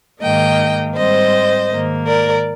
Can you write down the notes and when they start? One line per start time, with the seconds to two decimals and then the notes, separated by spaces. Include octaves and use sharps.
0.21 G#2 D#3 A#3 D#5 G5
0.95 G#2 G3 C4 C5 D#5
1.69 G#2 D#3 A#3
2.06 A#4 D5